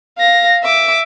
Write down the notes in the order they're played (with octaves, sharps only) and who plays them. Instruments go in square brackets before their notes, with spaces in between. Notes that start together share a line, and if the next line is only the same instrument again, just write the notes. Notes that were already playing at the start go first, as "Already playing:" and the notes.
[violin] F5 A#6
E5 D6